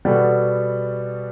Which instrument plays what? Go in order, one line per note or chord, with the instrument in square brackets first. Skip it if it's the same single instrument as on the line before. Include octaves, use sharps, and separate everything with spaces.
[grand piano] B2 G3 B3 F#4 A4